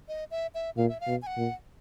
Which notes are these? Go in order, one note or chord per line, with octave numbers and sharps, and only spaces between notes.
D#5
E5
E5
A#2 F5
E5
F5
B2
G#5
F#5
A#2